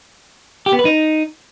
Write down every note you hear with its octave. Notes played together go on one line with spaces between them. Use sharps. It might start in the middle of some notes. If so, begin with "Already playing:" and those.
G4
B3
B4
D#4